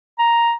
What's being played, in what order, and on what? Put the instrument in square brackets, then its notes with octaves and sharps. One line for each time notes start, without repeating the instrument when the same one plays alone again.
[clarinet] A#5